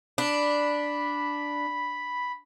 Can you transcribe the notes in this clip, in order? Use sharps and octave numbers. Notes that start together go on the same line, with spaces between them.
D4 B5